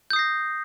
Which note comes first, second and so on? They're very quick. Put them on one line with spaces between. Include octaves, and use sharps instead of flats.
G6 D#6 C7 A#6